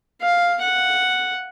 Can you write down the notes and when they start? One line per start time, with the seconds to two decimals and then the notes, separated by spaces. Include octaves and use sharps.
0.22 F5
0.62 F#5